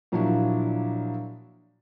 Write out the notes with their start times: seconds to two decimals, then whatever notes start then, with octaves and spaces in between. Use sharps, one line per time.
0.12 A#2 F3 F#3 D4 E4 F#4